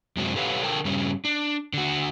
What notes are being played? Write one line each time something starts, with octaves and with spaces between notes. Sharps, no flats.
F#2 C3 G#3 C4 D4 F#4
G4 A4 B4 C#5 F5 F#5
D3 A4 A#4 G5 A5
G2 C#3 G3 C#4
D4
D3 F#4